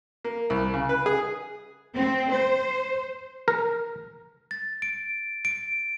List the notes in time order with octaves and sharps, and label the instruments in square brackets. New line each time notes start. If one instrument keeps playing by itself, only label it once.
[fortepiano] A#3
C2
C#3
B4
G#4
[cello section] C4
C5
[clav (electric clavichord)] A#4
[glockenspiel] A6
D7
D7